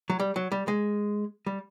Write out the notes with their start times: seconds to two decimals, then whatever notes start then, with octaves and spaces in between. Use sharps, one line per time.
0.10 F#3
0.20 G3
0.36 F#3
0.52 G3
0.68 G#3
1.46 G3